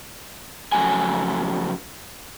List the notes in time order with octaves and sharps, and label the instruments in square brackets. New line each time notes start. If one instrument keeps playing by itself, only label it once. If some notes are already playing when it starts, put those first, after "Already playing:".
[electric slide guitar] F2 C#3 F#3 A3 G#5